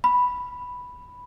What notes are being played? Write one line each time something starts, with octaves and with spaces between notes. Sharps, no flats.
B5